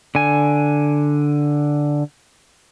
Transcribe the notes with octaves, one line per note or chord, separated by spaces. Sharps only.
D3 G#5